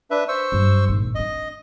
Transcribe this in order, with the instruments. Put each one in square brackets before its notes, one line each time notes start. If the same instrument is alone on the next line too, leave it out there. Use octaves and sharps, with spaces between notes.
[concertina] D4 B4 E5
C5 C#6 E6
[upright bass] G2 F#3
G#1 A#2
[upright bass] C4 D4 [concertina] D#5